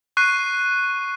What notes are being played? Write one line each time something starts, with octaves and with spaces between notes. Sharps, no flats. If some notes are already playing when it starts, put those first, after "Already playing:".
C#6 F#6 C7 D#7